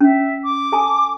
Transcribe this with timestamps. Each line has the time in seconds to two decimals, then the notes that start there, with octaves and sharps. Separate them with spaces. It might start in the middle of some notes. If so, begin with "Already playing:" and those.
0.01 C#4 E5
0.43 D6
0.72 A4 G#5 A5